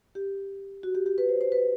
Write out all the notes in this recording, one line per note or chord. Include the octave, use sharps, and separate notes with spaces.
G4
F#4
G4
G4
B4
C5
C5
B4